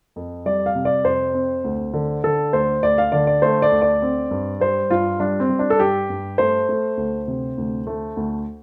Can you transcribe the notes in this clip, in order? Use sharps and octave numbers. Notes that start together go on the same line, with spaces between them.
F2
G3 D5
F5
C3
D5
F2 C5
C4
D2
D3
D3 A4
D2 C5
D2 D5
F5
D3 D5
D5
A3 C5
D5
D2
D5
C4
G2
G3 C5
G2 F4
G3 D4
C4
G3
D4
A4
G2 G4
G2
A3 C5
A3
D2
C3
D2
A3
D2